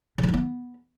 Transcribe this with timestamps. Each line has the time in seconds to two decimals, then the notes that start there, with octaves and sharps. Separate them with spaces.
0.18 C#3
0.23 D3
0.28 D#3
0.34 B3